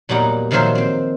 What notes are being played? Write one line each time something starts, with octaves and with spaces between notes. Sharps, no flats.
E2 A#2 F#3 G3 D#4 F#5
A#2 D#3 F3 F#3 C5 E5
C4 C5